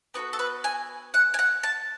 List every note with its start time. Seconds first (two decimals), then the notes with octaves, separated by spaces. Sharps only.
0.14 B3 F#4 A4 B4
0.33 A4
0.39 B4
0.64 G#5
1.14 F#5
1.34 G#5
1.39 F#5
1.63 A5